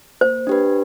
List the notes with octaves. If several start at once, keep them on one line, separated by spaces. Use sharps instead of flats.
A#3 C5
D4 G4 B4